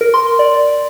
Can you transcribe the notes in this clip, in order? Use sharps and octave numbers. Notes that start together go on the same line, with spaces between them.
A#4
C6
D5